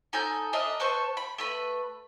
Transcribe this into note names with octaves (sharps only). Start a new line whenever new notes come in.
D#4 A4 G#5 G6
D4 A#4 D#5 E5
A4 B4 C5 C#6
B5
A3 B4 B5